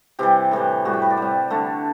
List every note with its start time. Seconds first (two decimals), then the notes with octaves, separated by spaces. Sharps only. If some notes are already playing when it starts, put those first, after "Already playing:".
0.19 C3 E3 G3 G4
0.51 A2 E3 G3
0.85 A2 G3 F#4
0.93 G4
1.02 B4
1.10 D5
1.17 C3 G3
1.50 D3 A3